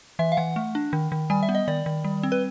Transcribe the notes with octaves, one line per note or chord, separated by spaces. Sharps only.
E3 E5
F5
E3 F#5
A3
D4
D#3
D#3
G3 G#5
E5
B3
D#5
D#3 D5
D#3
G3
C4
B4